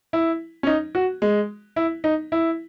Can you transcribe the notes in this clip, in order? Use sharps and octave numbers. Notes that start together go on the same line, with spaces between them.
E4
C#4
D#4
F#4
G#3
E4
D#4
E4